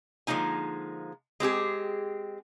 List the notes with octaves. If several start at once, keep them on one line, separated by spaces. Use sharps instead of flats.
D3 F3 G#3 A#3 D#4 G#5
G#3 C4 G4 G#4